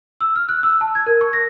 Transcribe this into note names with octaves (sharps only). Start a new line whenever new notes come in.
E6
F6
F#6
E6
A5
G#6
A#4
C#6
A#6